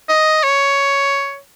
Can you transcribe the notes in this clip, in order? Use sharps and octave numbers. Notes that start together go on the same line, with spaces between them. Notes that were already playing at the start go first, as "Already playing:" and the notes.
D#5
C#5